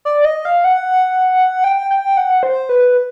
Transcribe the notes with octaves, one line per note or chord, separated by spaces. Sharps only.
D5
D#5
F5
F#5
G5
G5
F#5
C5
B4